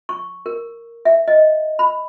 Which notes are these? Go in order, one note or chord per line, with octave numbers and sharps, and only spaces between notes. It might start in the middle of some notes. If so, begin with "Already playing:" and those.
C#6
A#4
E5
D#5
B5